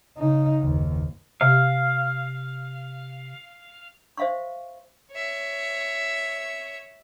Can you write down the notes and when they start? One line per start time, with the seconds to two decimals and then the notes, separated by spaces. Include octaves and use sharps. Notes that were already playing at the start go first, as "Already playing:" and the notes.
0.18 C#3 D#4
0.62 F#1 D#2
1.41 C3 F5
4.17 C5 E5 F5 C6 C#6
5.12 C#5 E5